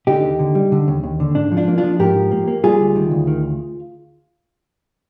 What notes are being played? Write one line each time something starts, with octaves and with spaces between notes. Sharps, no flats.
D3 D#4 G4
D#2
D3
G3
D3
D#2
D#2
D3
G#2 D4
F3
D4 F4
A#3
D4 F4
F3
G#2 G4 A#4
F3
A#3
A#3
G3 F4 G#4
D2
D#3
D2
D#3